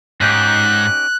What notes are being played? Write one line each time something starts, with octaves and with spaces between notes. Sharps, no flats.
G#2 C#4 D#4 G4 F#6